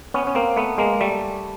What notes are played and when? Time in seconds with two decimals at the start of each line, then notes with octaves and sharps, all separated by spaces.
0.14 B3 C#4
0.27 C#4
0.35 A#3 C4
0.57 A3 B3
0.78 G#3 A#3
1.01 G3 A3